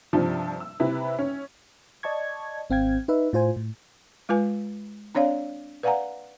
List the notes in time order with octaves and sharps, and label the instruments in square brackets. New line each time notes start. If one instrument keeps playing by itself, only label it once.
[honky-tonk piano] G2 C3 F3 D4
E6
C3 E4 B4
C#4
[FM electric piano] D5 D#5 A5 C#6 G#6
G#1 C4 F5 G5 G#6
D#4 B4 E5
A2 F4 C5 G#5
A2
[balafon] G#3 F4 B4 G#5
C4 D4 C#5 D5 F5
B4 D5 F5 F#5 G#5 A#5